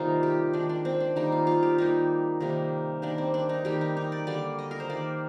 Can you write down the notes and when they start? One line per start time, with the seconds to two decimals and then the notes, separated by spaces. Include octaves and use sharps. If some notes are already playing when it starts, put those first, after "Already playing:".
Already playing: C3 D#3 G3 A#3 C4 D#4 F4
0.23 G4
0.53 D#3 G#3 D4
0.69 D4
0.85 C4
1.00 D4
1.16 D#3 G3 A#3 D#4
1.32 F4
1.47 F4
1.63 G4
1.78 D#3 G3 A#3 D#4
2.40 C3 D#3 G3 A#3
3.02 D#3 G3 A#3 D4
3.18 C4
3.34 D4
3.49 D#4
3.65 D#3 G3 A#3 G4
3.81 D#4
3.97 D#4
4.12 D5
4.27 D3 G3 A#3 D5
4.59 D#5
4.71 A#4
4.80 C5
4.89 D#3 G3 A#3 D5